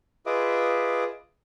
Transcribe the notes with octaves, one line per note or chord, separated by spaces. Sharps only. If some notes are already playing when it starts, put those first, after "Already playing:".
F4 G#4 B4 D#5 E5 D6